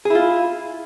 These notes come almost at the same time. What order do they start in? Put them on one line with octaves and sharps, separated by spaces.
G#4 E4 F4